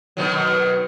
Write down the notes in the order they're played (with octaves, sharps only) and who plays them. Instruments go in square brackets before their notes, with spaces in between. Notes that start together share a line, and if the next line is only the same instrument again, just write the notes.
[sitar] B2 D#3 F#3